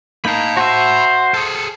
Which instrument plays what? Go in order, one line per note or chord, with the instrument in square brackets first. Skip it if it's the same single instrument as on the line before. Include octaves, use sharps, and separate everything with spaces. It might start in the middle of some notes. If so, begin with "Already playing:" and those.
[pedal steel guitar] A#3 D#4 A#4 [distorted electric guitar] A5 B5
[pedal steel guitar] F#4 E5 [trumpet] C5
[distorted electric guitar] G#4 A4